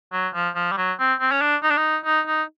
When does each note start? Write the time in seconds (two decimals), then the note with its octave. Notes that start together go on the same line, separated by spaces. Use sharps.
0.13 F#3
0.34 F3
0.55 F3
0.72 G3
0.78 F#3
0.99 C4
1.20 C4
1.32 C#4
1.41 D4
1.63 D#4
1.70 D4
1.77 D#4
2.05 D#4
2.28 D#4